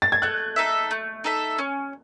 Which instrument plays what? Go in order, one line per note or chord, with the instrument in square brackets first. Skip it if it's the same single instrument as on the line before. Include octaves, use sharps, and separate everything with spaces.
[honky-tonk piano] A6
G#6
[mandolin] A3 [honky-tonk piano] F#6
[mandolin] D#4 A4 E5
A3
D#4 A4 E5
C#4